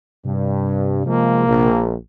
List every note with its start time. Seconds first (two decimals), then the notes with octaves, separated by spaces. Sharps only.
0.25 G2 C3
1.06 F3 G#3 A#3
1.47 A#1